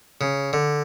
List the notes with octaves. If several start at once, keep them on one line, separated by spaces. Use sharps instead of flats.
C#3
D3